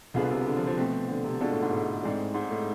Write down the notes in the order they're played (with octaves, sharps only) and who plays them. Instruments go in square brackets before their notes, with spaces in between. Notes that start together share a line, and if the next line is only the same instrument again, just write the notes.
[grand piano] C2 B2 B3 F4 G#4 [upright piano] D3
[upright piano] C3
D3
F3
F3
[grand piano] B2 A3 C4
[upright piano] D3
C3
[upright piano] B2 [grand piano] D3 G#3 D4 F4 A4
[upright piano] A2
G#2
A2
[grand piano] G#2 G#3 C4 G#4 D5
[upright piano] G#2
A2